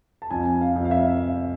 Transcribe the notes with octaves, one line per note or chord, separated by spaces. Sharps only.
A5
F2 G#5
F5
F2
F5
E5